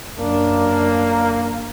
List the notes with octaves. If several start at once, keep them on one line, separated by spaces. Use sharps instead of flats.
F#2 A#3 D4